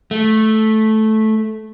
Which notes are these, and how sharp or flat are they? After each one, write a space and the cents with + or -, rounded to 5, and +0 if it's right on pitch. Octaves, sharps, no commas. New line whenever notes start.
A3 -10